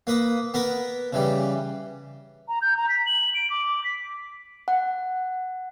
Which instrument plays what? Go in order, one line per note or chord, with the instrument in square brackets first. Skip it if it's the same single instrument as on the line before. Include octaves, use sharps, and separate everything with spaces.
[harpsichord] A#3 B4 D#6
B3 A#4 B4
C#3 E3 G3
[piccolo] A#5
G6
A#5
B6
F#7
D7
D6
B6
[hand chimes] F#5